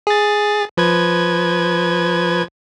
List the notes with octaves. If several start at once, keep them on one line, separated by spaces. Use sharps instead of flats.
G#4 A6
F3 B4 G#6